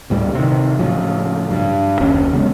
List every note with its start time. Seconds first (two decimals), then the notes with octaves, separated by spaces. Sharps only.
0.10 D2 A2 G3
0.34 C3 D#3
0.79 A2 C#3 F3 F#3
1.51 G2
2.00 F#1 D#2 C#4
2.33 C#3 F#3 G#3 B3